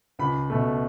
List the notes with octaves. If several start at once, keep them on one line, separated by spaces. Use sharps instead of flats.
C#2 B5
B2 A3